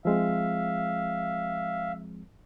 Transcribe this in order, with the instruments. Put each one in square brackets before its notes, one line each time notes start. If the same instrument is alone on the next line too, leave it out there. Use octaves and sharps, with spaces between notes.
[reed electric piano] F3 G#3 C4 [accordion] E5 F5